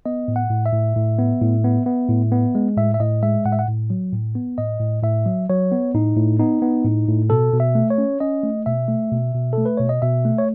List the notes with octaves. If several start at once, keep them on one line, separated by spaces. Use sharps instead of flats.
B3 D#5
A2
F#5
A2
E5
A2
A2
B3
A2
B3
B3
A2
B3
G#3
A2 E5
E5
A2 D#5
G#3 E5
A2 F#5
E5
F#5
A2
F#3
A2
B3
A2 D#5
A2
A2 E5
F#3
F#3 C#5
B3
A2 D#4
A2
B3 D#4
B3
A2
A2
B2 A4
B2
E5
A3
C#5
C#4
C#4 D#5
A3
B2 E5
A3
B2
B2
A3 A4
B4
B2 C#5
D#5
B2 E5
A3
C#5